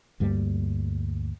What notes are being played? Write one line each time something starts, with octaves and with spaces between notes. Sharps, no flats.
D2 G2 G3 A#3